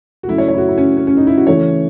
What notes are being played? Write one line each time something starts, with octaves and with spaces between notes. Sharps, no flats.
F#4
C#3 F#3 A3 E4
C#5
C#5
E4
F#4
E4
C#4
C#4
C#4
D#4
E4
F#4
C#3 E3 A3 C#5